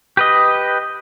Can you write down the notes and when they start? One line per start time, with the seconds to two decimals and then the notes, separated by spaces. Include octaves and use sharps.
0.17 G4 B4 D#5